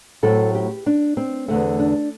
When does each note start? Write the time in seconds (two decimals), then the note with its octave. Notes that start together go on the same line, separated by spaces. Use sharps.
0.23 A2 F#3 C4 A4
0.55 G4
0.86 D4
1.17 C4
1.48 E2 D3 A3 C4
1.79 D4